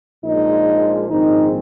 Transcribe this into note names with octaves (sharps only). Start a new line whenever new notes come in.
A#1 A#2 F3 G#3 D#4
A#1 G#2 D#3 G#3 C4 D#4